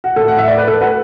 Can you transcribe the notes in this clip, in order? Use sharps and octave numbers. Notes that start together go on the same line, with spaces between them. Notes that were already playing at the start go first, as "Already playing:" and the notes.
F#4
A2 A4
F#5
A2 E5
D5
A3 B4
A4
A3
F#4 B4